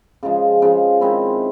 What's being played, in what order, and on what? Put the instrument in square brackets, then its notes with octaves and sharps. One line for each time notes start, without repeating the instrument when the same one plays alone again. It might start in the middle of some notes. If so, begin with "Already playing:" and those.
[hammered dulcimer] C#3 F3 G#3
C#3 F3 G#3
D#3 G#3 C4 E4